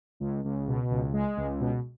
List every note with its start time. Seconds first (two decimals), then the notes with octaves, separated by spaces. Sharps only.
0.20 C#2
0.45 C#2
0.68 B2
0.91 C#2
1.13 G#3
1.37 C#2
1.60 B2